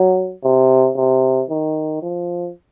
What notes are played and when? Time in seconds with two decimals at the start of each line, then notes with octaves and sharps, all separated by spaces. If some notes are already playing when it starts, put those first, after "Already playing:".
Already playing: F#3
0.44 C3
0.96 C3
1.50 D#3
2.02 F3